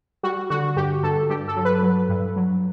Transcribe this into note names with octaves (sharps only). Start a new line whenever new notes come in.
G3 F#4
D3 F#4
G2 G4
G2 A4
G2 G4
A4
F#3
B4
F#3
G2
F#3